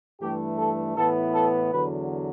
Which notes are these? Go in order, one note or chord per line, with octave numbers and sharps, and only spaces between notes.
G2 E3 A3 G4
A4
A2 E3 B3 A4
A4
E2 D3 F#3 B4